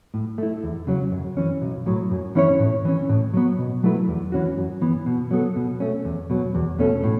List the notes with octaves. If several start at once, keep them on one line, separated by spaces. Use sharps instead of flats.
A2
A3 E4
E2
C#3 F#3
F#2
E3 C#4
B1
A2 F#3
F#2
E3 C#4 E4 C#5
A2
E3 C#4
A2
F#3 B3
B2
F#3 A3 E4 B4
E2
E3 C#4 F#4
F#2
E3 B3
B2
F#3 B3 A4
B2
A3 C#4
E2
B2 F#3
E2
B2 A3 C#4 A4
A2